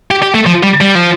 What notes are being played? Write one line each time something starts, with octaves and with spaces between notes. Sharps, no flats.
G4
G4
A3
F3
G3
G3
F3